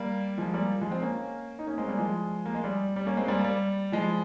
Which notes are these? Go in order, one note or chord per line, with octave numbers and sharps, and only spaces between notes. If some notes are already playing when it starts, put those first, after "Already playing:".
Already playing: G3 A#3
F3 G#3
G3 A#3
F3 G#3
G#3 C4
A#3 C#4
D#4
A#3 C#4
G#3 C4
G3 A#3
F3 G#3
A#3
G#3
G3
G3
A#3 C#4
G#3 C4
G3 A#3
G3
F3 G#3